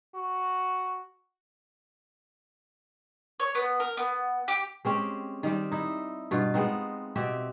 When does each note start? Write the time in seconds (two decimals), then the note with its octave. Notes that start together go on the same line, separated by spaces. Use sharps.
0.15 F#4
3.40 C#5
3.55 B3
3.80 A#4
3.97 B3
4.48 G4
4.85 G#3 C4 C#4 G4
5.43 D#3 G3 C4
5.72 D#4 E4
6.31 G2 B2 F4
6.54 G#3 B3 C4 D#4
7.16 B2 C4 G4 E5